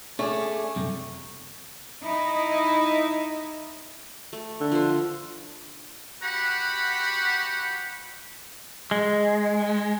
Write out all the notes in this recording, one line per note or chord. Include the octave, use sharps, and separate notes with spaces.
A3 C#4 G#4 D5
F#2 C3
D#4 E4 D#5 E5
A3
D3
F3 C5
F#4 G4 F#5 B5
G#3